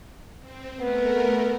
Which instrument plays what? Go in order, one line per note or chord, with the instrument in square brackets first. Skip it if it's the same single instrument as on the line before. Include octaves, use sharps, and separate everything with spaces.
[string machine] C4
[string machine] A3 A#4 [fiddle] B3